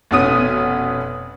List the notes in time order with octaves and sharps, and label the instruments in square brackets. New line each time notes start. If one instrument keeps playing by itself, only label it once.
[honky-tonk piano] F1 B2 B3 C#4 D#6 D#7